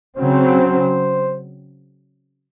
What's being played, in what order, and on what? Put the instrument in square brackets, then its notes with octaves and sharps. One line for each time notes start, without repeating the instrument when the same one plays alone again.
[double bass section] C#3 F#3 C4 [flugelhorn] C5